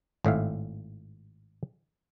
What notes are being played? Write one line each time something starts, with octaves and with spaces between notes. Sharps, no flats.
G#1 A2 E5 F5